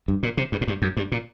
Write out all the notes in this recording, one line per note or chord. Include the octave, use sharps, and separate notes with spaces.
G2
A#2
C3
G2
A2
G2
F#2
G2
A#2